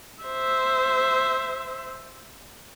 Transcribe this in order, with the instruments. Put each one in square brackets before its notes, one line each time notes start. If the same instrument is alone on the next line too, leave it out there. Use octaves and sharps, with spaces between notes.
[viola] C5 E5